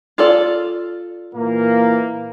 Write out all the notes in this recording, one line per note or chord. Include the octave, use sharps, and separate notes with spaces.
F4 A4 D5
A#2 E3 A#3